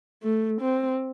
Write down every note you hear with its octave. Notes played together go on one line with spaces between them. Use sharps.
A3
C4